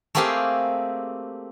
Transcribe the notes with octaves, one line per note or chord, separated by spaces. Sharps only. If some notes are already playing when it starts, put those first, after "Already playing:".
A3 A#3 C4 G4 G#4 F5